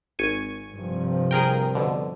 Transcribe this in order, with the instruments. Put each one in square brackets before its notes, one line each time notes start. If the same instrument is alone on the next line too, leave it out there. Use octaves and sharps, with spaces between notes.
[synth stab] G#1 G#5 C#6
[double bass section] G2 C3 F3
[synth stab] G#4 A#4 G5
B2 D3